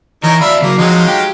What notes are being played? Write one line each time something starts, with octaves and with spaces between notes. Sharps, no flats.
E3 D#4 A#4 C#5
D4 E4 E5 F5 B5
C#3 F#3 A#3
F2 F3 F#3 G#3 D#4
G4